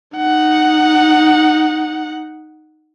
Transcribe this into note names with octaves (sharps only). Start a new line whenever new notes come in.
D#4 F#5